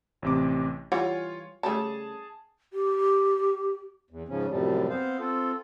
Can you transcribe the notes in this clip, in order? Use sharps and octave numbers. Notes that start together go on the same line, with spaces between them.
A1 C3 D6
E3 G3 F4 C#5 F#5
C#3 G3 A3 G#4 A5
G4
E2
G#2 C#3 F3 C#4
F#2 A2 C3 F3 G3
B3 C4 C5 F5
C4 F4 A4